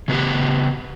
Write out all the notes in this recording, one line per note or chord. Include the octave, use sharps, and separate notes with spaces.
C#3 B3 F#4 G4